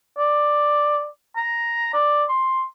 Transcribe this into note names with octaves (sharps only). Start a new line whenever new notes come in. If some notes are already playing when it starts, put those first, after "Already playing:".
D5
A#5
D5
C6